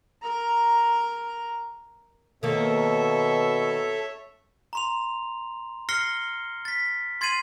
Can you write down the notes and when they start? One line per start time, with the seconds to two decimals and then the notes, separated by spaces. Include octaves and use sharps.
0.22 A#4 A#5
2.43 B2 D#3 A#3 A4 C#5 E5
4.73 A#5 C6 F7
5.89 F6 A#6 C7 C#7 G7
6.65 A6 B6
7.21 C6 G#6 A6 C7 D#7 F#7